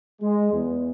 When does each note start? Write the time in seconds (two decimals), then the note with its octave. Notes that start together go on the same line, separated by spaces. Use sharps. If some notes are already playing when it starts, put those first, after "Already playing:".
0.21 G#3
0.52 E2